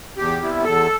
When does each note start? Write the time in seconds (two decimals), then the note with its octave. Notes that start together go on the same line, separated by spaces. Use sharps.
0.17 E2 G4
0.42 C3 G3 B3 E4
0.64 E2 A4